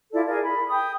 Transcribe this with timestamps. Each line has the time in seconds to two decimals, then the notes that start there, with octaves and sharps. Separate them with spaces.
0.13 E4 F4 A4 D5
0.26 G#4 A#4 D5
0.42 B5
0.71 G5 D#6